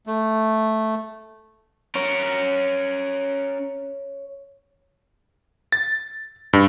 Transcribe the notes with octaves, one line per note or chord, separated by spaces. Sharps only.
A3
C#4 A#4 C#5
A6
G2